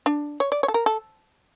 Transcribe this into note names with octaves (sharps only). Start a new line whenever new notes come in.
D4
C#5
D5
C#5
A4
A#4
A4